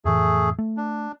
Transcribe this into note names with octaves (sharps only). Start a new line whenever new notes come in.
F2 A2 E3 A3 G#4
A3
D4